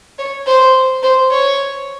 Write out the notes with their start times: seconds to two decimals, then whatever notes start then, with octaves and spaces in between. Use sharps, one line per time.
0.18 C#5
0.46 C5
1.03 C5
1.31 C#5